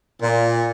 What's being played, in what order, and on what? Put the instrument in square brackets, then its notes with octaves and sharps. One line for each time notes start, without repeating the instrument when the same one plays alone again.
[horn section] A#2